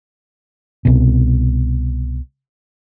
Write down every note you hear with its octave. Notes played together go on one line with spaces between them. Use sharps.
C2 B2